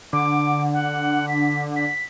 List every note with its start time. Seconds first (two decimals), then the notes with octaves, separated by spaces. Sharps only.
0.13 D3 D6
0.73 F#5
1.28 B6
1.76 B6